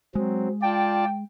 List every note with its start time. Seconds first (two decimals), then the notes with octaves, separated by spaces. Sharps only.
0.15 F#3 G#3 C4
0.62 F4 D5 G5 A5